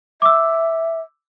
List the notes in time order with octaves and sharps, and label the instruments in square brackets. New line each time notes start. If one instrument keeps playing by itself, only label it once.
[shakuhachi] E5 [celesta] D6 E6